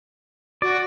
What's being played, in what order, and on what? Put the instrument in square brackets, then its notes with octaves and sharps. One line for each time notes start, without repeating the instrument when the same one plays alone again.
[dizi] F#4 [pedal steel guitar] D5